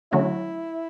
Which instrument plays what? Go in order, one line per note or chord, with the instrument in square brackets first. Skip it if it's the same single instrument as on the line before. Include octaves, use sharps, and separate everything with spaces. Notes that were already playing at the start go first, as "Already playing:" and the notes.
[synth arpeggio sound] D3 F#3 A3 C#4 F#4 [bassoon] E4